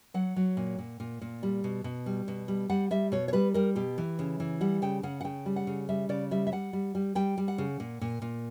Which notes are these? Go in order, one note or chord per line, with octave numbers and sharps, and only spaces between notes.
F#3 F#5
F#3
A#2
A#2
A#2
A#2
G3
B2
B2
G3
B2
G3
G3 F#5
G3 E5
B2 C#5
C#5
G3 B4
G3 A#4
B2 G4
E3
C#3
E3
G3 F#5
C#3 G5
C#3 F#5
F#5
C#3 G5
G3
F#5
C#3
G3 E5
C#3 D5
G3 E5
E5
G3 F#5
G3
G3
G3 G5
G3
F#5
C#3
A#2
A#2
A#2